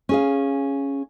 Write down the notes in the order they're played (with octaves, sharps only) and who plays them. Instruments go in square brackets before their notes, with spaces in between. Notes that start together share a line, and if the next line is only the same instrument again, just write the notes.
[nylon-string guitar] C#4 G#4 F5